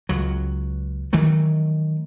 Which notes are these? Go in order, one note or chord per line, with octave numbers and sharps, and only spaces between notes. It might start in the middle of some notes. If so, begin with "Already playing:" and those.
C#2 F#3
D#3 E3 F#3 A3